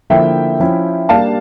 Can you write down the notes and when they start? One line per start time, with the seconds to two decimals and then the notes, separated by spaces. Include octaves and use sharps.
0.10 D3 F3 A#3 E4 E5 G5
0.60 F3 C#4 E4
1.09 G3 A#3 D4 G4 F5 A5